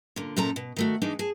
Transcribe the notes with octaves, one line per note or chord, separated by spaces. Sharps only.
A#2 D3
F#2 A#2 F3 A4 A#5
B2
D#3 A3 F#4
E3 G#3 D4 D#4
G#4 A5